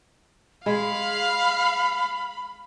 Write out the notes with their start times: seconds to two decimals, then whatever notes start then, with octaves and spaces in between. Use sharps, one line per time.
0.66 G#3 F5 B5